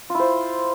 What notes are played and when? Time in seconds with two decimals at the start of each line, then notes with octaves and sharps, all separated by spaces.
0.10 F4
0.15 E4
0.20 C5